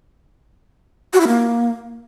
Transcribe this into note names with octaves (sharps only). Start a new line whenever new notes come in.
F#4
E4
A#3